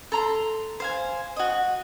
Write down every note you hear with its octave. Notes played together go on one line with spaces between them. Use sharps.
A4 A#5 C6
C5 F5 G#5
F#4 D#5